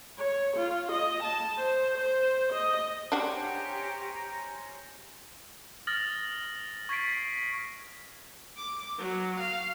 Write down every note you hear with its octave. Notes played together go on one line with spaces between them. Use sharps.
C#5
F4
D#5
A5
C5
C5
D#5
C#4 D4 F#4 G4 C5 A#5
D#6 F6 A6 A#6 F#7
C#6 G#6 A6 B6 C7 D7
D6
F#3
F5